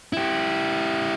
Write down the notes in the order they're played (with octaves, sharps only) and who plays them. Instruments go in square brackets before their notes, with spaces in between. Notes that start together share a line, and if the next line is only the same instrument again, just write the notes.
[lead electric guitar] E4 G4